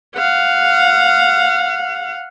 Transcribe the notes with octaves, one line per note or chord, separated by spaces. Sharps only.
F5 F#5